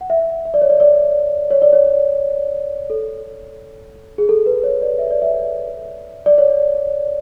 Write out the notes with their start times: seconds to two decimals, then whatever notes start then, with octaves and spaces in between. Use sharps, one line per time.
0.01 F#5
0.10 E5
0.45 E5
0.54 D5
0.61 C#5
0.70 D5
0.80 D5
1.51 C#5
1.62 D5
1.73 C#5
2.90 A4
4.18 G#4
4.29 A4
4.46 B4
4.63 C#5
4.82 D5
4.99 E5
5.11 D5
5.22 E5
6.26 D5
6.38 C#5